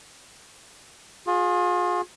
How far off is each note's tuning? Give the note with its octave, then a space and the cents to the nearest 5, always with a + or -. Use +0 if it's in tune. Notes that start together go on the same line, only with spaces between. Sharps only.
F4 +35 G#4 +0